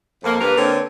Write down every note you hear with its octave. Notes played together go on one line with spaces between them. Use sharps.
F2 A#3
G2 A#3 A#4 B4
D3 A#3 C4 B4 C#5